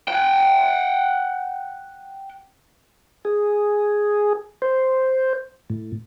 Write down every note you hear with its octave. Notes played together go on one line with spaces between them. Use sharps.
F#5 G5
G#4
C5
A2